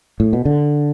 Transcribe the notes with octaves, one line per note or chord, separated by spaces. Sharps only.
A2
B2
D3